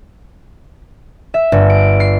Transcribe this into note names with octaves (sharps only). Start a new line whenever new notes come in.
E5
G1
D7
C7